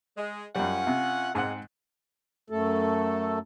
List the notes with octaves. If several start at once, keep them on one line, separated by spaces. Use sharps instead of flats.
G#3
F#2 G3 C#4 F4 F#5
C3
G#2 G#3 C4 F#5
F#2 A3 A4